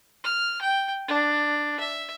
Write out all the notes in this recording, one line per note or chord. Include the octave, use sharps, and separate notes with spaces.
F6
G5
D4
E5